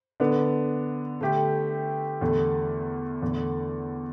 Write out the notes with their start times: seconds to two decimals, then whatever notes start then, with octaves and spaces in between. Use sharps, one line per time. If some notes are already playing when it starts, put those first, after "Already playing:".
0.20 D3 B3 D4
1.21 D3 A3 G4
2.21 E2 D3 A3
3.22 E2 D3 A3